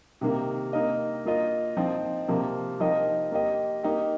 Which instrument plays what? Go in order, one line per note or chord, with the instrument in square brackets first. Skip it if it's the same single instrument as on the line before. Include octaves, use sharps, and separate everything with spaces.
[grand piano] C3 D#3 A#3
A#3 D#4 A#4 D#5
A#3 F4 D#5
F3 C4 D#4
C3 F3 A#3
F3 D#4 G4 A#4 D#5
A#3 G4 D#5
A#3 D#4 G4